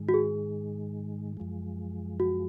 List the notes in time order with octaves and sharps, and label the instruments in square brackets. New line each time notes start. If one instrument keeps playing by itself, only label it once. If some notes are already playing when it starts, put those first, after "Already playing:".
Already playing: [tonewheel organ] G#2 D#3 G#3
[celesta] F#4
G#4
[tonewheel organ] F#2 F3 G#3
[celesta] F#4